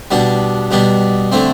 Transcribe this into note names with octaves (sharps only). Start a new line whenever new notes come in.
B2 G3 B3 D4
B2 G3 B3 D4
D3 A3 C4